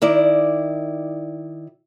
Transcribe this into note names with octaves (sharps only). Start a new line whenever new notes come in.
D#3 E4 D5